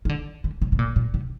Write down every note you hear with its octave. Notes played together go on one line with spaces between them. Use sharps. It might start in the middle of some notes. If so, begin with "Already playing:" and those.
D#3
D3
D3
C3
C3
A#2
A#2
C3